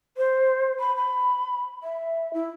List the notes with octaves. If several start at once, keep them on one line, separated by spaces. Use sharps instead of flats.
C5
B5
B5
E5
E4